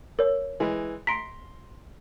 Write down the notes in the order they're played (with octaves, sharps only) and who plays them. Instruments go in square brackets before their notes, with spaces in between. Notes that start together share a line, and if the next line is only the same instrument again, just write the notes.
[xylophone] A#4 C#5
[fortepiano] E3 G#3
[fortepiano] A#5 C6 [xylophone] B6 D7